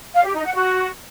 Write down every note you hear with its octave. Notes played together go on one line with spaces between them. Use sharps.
F5
G4
D#4
F#5
F#4